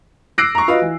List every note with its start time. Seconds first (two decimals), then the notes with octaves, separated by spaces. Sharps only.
0.38 D6 E6 F#6 A#6 C7 D7
0.55 A#5 C#6
0.68 F4 F#4 B4 D#5 F5
0.82 E3